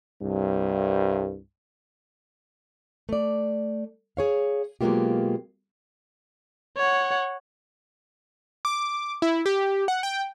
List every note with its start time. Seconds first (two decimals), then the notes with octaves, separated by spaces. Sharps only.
0.22 C2 G2
3.09 A3 D5
4.17 G#4 C#5 F5
4.81 B2 F#3 G#3 A#3 F4 G4
6.77 C#5 F#5
8.65 D6
9.22 E4
9.46 G4
9.88 F#5
10.03 G5